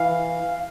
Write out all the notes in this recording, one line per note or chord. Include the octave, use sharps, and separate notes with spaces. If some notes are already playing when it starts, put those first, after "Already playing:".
Already playing: E3 F5